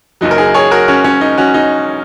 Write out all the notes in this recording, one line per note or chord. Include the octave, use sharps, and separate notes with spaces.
F#1 F#2 F#3 D#4
A#4
D#4 G#4
G#4 C#5
F#4 A#4
C#4 F#4
C#4
D#4
C#4 F#4
D#4